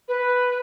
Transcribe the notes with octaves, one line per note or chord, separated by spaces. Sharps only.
B4